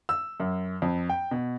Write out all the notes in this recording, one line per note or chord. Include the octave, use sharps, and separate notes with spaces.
E6
F#2
F2
G5
B2